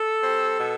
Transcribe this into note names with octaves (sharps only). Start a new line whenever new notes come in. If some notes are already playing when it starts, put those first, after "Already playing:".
Already playing: A4
G3 C4
B2